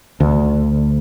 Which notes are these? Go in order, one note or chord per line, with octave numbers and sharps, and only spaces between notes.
D2